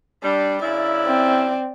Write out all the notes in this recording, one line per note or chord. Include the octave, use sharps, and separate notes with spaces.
G3 D4
F#2 C#3 E4 D5
C4